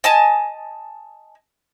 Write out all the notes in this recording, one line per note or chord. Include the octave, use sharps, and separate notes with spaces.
D#5 G#5 A5